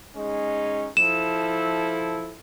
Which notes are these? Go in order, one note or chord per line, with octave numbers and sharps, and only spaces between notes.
G#3 C#4 D#4
F3 E4 A4 E7